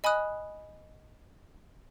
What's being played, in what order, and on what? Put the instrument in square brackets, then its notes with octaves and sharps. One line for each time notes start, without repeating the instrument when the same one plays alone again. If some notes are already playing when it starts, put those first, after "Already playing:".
[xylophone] D#5 G#5 B5 D#6 F#6